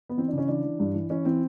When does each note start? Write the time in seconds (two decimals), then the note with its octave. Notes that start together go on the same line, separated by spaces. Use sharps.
0.09 B3
0.17 E3 C4
0.28 D4
0.33 C#3 C#4
0.48 E3 D4
0.64 E3
0.79 G2
0.94 E3
1.10 E3 C#4
1.25 E3 C4